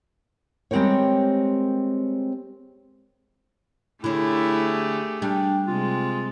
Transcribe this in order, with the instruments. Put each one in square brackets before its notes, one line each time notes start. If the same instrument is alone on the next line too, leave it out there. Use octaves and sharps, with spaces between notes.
[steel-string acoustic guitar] G3 G#3 C4 G4 A#4 C#5
[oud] D3 C#4 [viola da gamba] A3 G4 G#4 [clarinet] E4
[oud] G3 [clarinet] D4
[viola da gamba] C3 G#3 [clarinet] F4